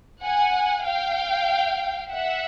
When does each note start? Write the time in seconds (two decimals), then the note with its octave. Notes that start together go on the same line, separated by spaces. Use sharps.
0.23 F#5 G#5
0.85 F5 G5
2.11 E5 F#5